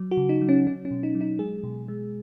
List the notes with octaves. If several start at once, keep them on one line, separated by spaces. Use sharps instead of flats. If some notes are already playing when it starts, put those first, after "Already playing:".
Already playing: F#3
F#4
C#3
D#4
F#3
C#4
F#3 C#4
C#4
B2
D#4
F#3
D#4
G#3 G#4
B2
G#3